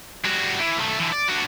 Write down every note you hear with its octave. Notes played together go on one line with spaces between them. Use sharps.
G3 F#4
E3
B1 A3
D3 E3
D5
D4 F#4